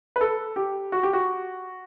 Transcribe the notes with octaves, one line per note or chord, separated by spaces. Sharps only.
B4
A4
G4
F#4
G4
F#4